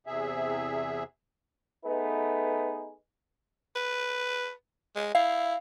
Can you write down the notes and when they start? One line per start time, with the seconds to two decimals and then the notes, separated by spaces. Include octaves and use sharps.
0.07 E2 C3 G#4 E5
1.84 A3 B3 D#4 G#4 B4
3.76 B4
4.96 G#3
5.15 E4 F5